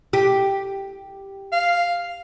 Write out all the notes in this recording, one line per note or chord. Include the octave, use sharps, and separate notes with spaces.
G4
F5